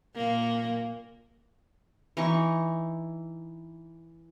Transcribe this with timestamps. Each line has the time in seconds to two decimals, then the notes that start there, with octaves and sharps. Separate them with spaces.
0.15 A#2 A#3
2.17 E3 D#4 C#6